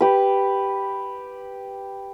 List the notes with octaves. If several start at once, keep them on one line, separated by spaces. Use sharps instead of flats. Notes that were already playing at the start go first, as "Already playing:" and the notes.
G4 B4